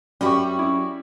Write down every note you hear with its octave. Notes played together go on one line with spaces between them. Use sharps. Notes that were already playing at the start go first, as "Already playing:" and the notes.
F#2 G3 C#4 F#4 G4 E5 B5 C#6
E4